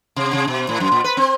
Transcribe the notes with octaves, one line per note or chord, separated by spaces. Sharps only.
C3
C3
B2
A2
F#2
A#2
B4
C4